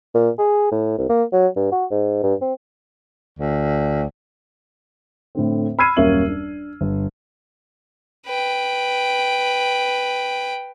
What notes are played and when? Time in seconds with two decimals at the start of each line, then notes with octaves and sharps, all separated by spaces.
0.15 A#2
0.39 G#4
0.72 A2
0.98 C2
1.10 A#3
1.33 F#3
1.56 G2
1.72 F#4
1.91 G#2
2.23 G2
2.41 C4
3.39 D2
5.35 A2 D3 C4
5.79 B5 E6 F6 G#6 C7 D#7
5.97 D#1 F#2 A#3 C#4 E5 F#7
6.28 D4
6.81 G1
8.26 B4 G5